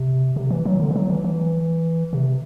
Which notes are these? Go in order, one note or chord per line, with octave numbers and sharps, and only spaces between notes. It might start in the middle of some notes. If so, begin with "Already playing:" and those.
Already playing: C3
C3
E3
F#3
D3
E3
F#3
E3
E3
C3